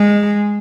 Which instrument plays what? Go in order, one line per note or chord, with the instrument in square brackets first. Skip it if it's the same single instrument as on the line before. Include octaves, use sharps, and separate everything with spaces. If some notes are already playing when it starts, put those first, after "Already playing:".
Already playing: [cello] G#3